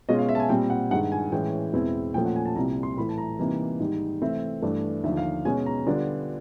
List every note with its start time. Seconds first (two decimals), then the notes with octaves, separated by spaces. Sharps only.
0.09 B2 G#3 C#4 F4 D#5
0.19 F5
0.29 E5
0.35 A5
0.40 G#5
0.49 A#2 G3 C4 G5
0.70 F#5
0.91 G2 D#3 G#3 F#5
1.12 G#5
1.32 A2 E3 G#3 C#4 G5
1.73 E2 B2 G#3 C4 E4
2.14 A#2 F3 A3 C#4 G5
2.25 F#5
2.36 G#5
2.46 A5
2.56 C2 A#2 G3 C4 A#5
2.83 C6
2.97 A2 E3 A3 B5
3.09 A5
3.18 A#5
3.39 C3 E3 G3 A#3 D#4
3.80 G#2 D#3 G3
4.22 C3 E3 A3 C4 E5
4.62 G2 E3 A3 D4
5.04 D#2 D3 F3 E5
5.17 F5
5.45 B2 G#3 C#4 G#5
5.66 A#5
5.86 D3 G3 B3 D4 F4